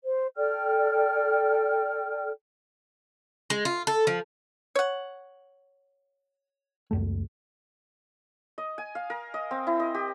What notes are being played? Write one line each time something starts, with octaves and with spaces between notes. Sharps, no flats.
C5
A4 D5 G5 F6
G#3
F4
A4
F3
C#5 F#5
C#2 F#2 A3
D#5
G#5
F5
A#4
D#5
C4
E4
D#5
G4